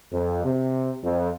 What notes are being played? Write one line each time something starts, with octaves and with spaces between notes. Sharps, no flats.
F2
C3
F2